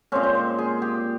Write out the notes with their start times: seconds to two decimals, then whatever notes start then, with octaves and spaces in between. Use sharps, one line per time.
0.12 A#2 G#3 C4 C#4
0.23 C5
0.35 C5
0.58 G#4
0.82 G4